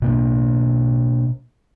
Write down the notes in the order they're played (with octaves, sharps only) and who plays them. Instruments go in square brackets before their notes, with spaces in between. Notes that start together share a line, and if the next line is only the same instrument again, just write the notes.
[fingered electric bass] B2 A#3 D4